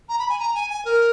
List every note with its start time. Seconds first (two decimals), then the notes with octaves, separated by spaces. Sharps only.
0.09 A#5
0.19 B5
0.29 G#5
0.39 A#5
0.54 G#5
0.70 G#5
0.85 A#4